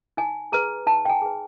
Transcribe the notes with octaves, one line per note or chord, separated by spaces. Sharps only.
D#4 G#5
G#4 B4 A#5
D#4 A5
G5
G#5
G#4 B4